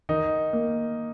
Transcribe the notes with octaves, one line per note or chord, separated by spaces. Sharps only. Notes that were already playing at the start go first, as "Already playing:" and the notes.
D#3 D#4
A#3